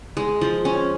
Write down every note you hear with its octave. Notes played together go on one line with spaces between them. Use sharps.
G#3
F3
C#4